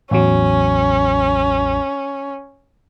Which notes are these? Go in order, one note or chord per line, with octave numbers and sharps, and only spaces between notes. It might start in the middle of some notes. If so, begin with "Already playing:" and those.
A1 E2 F#3 C#4